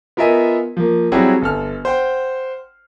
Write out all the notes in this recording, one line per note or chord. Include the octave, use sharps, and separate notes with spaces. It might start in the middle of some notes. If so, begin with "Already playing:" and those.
B3 F4 A#4 D#5 E5 G#5
F3 A#3
F#3 G3 C4 E4 F#4 G#4
G1 A4 F6
C5 F#5 G5